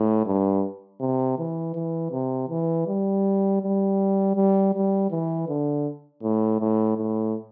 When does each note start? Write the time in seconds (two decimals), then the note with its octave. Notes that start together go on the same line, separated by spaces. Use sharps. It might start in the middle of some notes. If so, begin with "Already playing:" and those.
Already playing: A2
0.26 G2
1.00 C3
1.38 E3
1.75 E3
2.12 C3
2.49 E3
2.87 G3
3.62 G3
4.36 G3
4.74 G3
5.11 E3
5.48 D3
6.23 A2
6.60 A2
6.97 A2